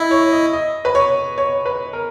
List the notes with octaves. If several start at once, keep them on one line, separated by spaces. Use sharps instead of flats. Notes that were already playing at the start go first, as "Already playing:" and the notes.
Already playing: E4 D#5
C#5
D#5
D#5
B4
C#5
C#5
B4
A#4